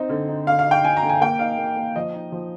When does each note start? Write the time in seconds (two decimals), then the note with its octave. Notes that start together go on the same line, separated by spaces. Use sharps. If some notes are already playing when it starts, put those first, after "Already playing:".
Already playing: C4 D#4
0.09 D3
0.29 D#4
0.47 D3 F5
0.59 F5
0.66 D#4 G5
0.84 D#4 G#5
0.97 A#5
1.03 D3
1.09 G#5
1.21 A#3 G5
1.39 D#4 F5
1.58 A#3
1.77 A#3
1.96 F3 D#5
2.14 D#4
2.32 F3